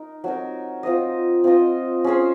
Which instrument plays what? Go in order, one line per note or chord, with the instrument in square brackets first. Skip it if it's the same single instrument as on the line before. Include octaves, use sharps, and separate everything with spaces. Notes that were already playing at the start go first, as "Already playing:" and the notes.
Already playing: [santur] D#4 A#4
F#3 C4 D#4 A#4
C4 F4 C5 D#5
C4 F4 C5 D#5
C#4 G#4 C5